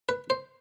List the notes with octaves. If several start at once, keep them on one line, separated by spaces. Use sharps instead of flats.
B4
C5